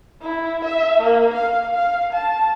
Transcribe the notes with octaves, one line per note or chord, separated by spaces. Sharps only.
E4
E5
A#3
F5
F5
A5